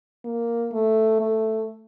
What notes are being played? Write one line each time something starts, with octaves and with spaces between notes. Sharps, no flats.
A#3
A3
A3